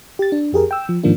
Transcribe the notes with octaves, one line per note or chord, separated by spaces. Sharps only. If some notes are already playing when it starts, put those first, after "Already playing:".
G4 A6
D4
F2 G4 G#4 A#4
G5 E6
F3
G#2 D#3 F3 A#3 D4